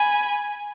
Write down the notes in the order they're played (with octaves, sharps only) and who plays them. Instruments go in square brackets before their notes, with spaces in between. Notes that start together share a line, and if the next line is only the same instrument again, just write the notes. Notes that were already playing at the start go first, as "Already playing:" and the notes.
Already playing: [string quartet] G#5 B5